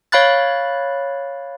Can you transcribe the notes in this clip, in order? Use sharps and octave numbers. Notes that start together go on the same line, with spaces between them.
C#5 F5 B5 F#6 A6